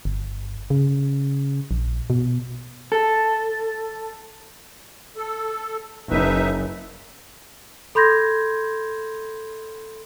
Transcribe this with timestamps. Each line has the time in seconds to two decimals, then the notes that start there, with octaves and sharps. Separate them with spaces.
0.05 G1
0.70 C#3
1.71 A#1
2.10 B2
2.92 A4
5.16 A4
6.10 F#1 D#4 B4 E5
7.95 A4 B5 C6 G6 G#6 A#6